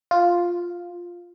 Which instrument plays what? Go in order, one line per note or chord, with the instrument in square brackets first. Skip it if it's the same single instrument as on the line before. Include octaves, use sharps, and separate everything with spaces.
[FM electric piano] F4